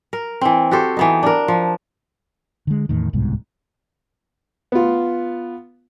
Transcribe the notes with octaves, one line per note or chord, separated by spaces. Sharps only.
A#4
E3 C4
F#4 G4 A4 C5
E3 B3 D#4
D4 A#4
F3
D3 G#3
E2 A2 D#3
D1 C2 G#2 B2
B3 F4